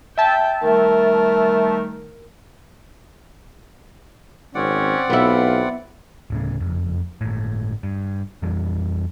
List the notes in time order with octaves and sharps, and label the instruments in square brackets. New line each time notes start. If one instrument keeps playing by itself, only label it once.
[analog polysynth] E5 A5 [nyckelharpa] G5
[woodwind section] D#3 G3 A3 [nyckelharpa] A#4
[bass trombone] G#1 [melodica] C4 D5 F#5 [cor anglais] C#4
[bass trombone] B1 [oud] B3 E4 [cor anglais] F4
[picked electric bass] D1 A2 C#3
F#1 F2
G1 A2
G2
F2 E3 G3